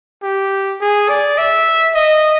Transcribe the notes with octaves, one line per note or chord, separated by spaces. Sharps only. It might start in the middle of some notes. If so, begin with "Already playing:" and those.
G4
G#4
D5
E5
D#5